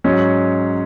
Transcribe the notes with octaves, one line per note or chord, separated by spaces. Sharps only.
G#2 F#3 C#4